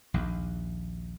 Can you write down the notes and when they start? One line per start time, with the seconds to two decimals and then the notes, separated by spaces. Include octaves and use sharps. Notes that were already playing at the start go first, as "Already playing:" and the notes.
0.14 A#1 D#2